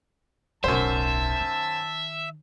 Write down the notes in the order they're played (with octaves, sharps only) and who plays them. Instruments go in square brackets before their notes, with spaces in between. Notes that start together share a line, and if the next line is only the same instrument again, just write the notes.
[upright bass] D1 B1 [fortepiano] F#2 C5 [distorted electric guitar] E5 [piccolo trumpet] A5
[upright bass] D#3